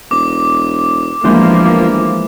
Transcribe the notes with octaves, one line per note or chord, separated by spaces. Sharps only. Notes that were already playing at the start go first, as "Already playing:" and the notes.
E1 D6
G1 E3 F3 G#3 A#3 C5